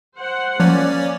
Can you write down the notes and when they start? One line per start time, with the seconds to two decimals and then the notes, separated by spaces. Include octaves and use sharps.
0.17 C5 F#5
0.60 F3 A#3 C#4 C#5 D5